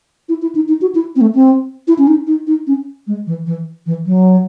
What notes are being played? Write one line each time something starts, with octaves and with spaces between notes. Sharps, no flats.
E4
E4
D#4
D#4
F#4
E4
C4
A3
C4
E4
C#4
D#4
D#4
D#4
C#4
G#3
E3
E3
E3
F#3